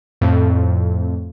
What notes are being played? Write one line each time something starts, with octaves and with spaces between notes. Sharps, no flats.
F2 A2